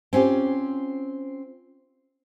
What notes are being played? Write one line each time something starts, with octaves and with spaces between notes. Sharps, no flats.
C4 C#4 F4 G4